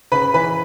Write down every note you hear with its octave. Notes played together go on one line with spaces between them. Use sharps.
C#3 B4 B5
E3 B4 B5